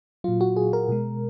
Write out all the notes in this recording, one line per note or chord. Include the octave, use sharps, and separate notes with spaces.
A#2 F#3 F4
F#4
G#4
A#4
B2 G#3